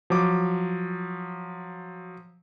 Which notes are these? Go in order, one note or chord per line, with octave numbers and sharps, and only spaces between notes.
F3 F#3 D6